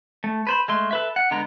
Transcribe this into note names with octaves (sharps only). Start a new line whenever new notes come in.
A3
B4 C5 B5
G#3 A3 C6
A4 B4 E5
F#5
D3 G#3 B3 A#5